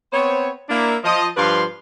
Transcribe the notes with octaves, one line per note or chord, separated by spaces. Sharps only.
B3 C4 C5 C#5
A#3 D4 E4
F3 D#5
G2 F3 G3 B4 F5 C6